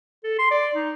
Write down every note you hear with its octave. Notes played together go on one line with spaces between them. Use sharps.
A4
C6
D5
D#4